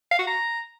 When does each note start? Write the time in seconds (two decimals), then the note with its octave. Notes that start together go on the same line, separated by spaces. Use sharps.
0.11 F5
0.19 F#4
0.27 A#5